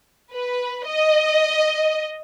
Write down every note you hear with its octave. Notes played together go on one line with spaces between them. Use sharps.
B4
D#5